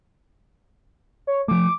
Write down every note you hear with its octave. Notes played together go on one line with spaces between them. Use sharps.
C#5
F3 A3 D6